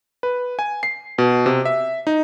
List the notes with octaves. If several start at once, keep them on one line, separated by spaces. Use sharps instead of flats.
B4
G#5
C7
B2
C3
E5
D#4